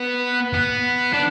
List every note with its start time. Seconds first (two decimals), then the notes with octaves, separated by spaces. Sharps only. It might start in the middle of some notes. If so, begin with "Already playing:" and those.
Already playing: B3
0.53 B3
1.13 D4